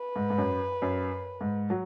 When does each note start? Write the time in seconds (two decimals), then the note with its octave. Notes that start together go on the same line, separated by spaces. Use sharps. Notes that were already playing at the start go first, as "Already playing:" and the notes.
Already playing: B4
0.16 G#2
0.30 G#2
0.38 F#2
0.82 F#2
1.41 G#2
1.70 F#3